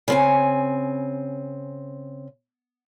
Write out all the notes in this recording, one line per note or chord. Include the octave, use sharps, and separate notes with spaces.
C#3 C4 G#5